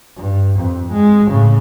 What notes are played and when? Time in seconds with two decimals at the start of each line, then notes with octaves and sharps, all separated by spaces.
0.16 G2
0.60 F2
0.93 G#3
1.28 A2 C#3